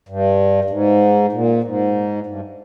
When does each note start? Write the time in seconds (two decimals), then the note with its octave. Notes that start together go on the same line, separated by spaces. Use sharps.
0.09 G2
0.64 G2
0.70 G#2
1.33 A#2
1.64 G#2
2.27 G2